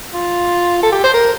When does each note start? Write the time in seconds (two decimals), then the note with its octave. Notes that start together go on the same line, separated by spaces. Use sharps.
0.14 F4
0.83 A4
0.92 G4
1.04 C5
1.14 A#4